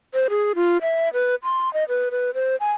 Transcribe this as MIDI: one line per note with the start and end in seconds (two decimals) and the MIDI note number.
0.14 0.28 72
0.30 0.53 68
0.55 0.78 65
0.82 1.09 76
1.14 1.35 71
1.44 1.72 84
1.74 1.84 75
1.89 2.09 71
2.11 2.31 71
2.35 2.56 72
2.60 2.73 80